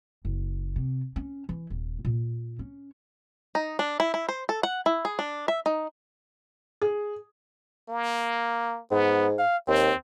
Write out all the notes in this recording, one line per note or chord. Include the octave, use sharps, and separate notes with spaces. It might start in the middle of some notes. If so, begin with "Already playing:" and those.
F#1
C3
C#4
E3
D#1
A#2
C#4
D#4
D4
E4
E4
C5
A4
F#5
E4
G#4
D4
E5
D#4
G#4
A#3
G#2 B3
F5
D#2 C4